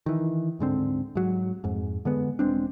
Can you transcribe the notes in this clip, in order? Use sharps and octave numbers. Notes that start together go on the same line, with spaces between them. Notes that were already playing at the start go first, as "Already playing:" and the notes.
D#3 E3
D1 G#2 D3 C4
G#2 F#3
F2 G#2
D3 G#3 B3
E1 G#3 C4 D4